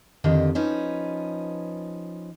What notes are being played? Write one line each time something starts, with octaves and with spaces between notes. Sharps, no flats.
F2 D3 D#3 G4 D#5
F3 C#4 D#4 B4